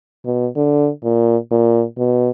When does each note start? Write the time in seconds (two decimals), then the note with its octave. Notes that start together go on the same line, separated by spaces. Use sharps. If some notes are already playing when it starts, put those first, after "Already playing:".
0.25 B2
0.56 D3
1.04 A#2
1.51 A#2
1.98 B2